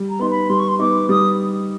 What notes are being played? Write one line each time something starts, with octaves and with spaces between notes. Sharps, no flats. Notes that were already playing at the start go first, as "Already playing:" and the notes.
Already playing: G3
A#5
B3 D#4 C6
B5
G3 C6
C#6
C6
B3 D#4 D6
G3 D#6